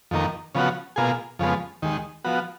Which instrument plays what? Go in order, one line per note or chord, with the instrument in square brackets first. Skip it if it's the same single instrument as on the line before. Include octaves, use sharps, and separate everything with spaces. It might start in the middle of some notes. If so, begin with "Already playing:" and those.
[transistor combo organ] F2 D#3 A#3
C#3 F3 B3 F#4
B2 A#3 F4 G#4
F2 C#3 F3 G#3 B3
D#2 D#3 G#3
F3 B3 F#4